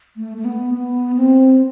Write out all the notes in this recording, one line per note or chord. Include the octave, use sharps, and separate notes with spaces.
A3
A3
B3
B3
C4